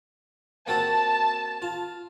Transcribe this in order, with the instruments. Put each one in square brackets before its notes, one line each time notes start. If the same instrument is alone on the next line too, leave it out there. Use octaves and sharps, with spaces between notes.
[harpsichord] A#3 C4 F#4 [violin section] A5
[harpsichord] F4